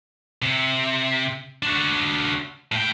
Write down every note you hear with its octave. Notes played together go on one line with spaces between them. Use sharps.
C3
D4 F#4
A2 G5